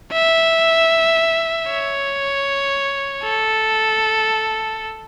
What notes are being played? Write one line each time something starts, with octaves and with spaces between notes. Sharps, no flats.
E5
C#5
A4